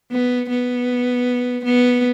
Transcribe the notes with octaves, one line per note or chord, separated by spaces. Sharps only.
B3
B3
B3